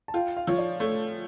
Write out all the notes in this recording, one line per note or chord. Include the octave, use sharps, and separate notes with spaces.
A5
F4 G5
F5
F3 C#5
D5
A3 C#5